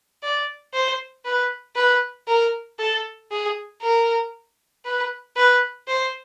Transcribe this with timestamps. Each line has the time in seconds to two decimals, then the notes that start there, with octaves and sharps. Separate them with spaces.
0.23 D5
0.74 C5
1.25 B4
1.76 B4
2.28 A#4
2.79 A4
3.31 G#4
3.82 A#4
4.85 B4
5.36 B4
5.88 C5